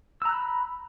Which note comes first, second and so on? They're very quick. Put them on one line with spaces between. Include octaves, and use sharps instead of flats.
E6 A#5 F#6 B5